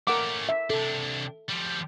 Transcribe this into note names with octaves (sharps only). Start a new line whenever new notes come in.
A3 C#4 A#4 F#5 D6
E5
C3 D4 A4
F3 G3